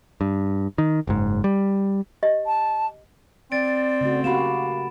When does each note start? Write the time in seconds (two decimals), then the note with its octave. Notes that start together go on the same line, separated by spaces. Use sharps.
0.21 G2
0.78 D#3
1.07 F#1 G#2
1.44 G3
2.23 G4 D#5
2.46 A5
3.52 C4 D5 A6 D7
4.01 C#3 A3 F#4
4.24 A#3 F#4 G4 F5 B5 E7